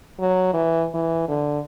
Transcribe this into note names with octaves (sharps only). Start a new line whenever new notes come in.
F#3
E3
E3
D3